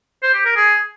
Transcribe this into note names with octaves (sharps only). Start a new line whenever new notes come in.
C5
G4
A#4
G#4